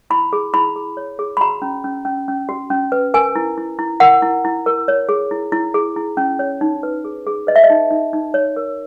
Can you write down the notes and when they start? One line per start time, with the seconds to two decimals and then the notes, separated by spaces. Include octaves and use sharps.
0.10 E4 B5
0.33 G#4
0.54 E4 B5
0.76 G#4
0.97 C#5
1.19 G#4
1.37 B5
1.41 F#4 A#5
1.62 C#4
1.84 C#4
2.05 C#4
2.28 C#4
2.49 F#4
2.70 C#4
2.92 B4
3.14 A#4 G#5
3.36 E4
3.57 E4
3.79 E4
4.00 A#4 F#5
4.22 E4
4.45 E4
4.66 A#4
4.88 C#5
5.09 G#4
5.31 E4
5.52 E4
5.74 G#4
5.96 E4
6.17 C#4
6.39 C#5
6.61 D#4
6.83 B4
7.05 G#4
7.27 G#4
7.47 B4 D#5
7.56 E5
7.64 D#5
7.70 D#4
7.91 D#4
8.13 D#4
8.34 C#5
8.56 A#4